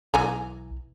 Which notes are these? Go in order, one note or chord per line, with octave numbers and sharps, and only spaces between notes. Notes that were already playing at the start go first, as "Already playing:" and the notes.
B1 E3 G#5 A#5